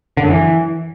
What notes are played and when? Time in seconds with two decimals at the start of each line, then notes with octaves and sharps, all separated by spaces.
0.17 D3
0.24 F#2
0.30 E3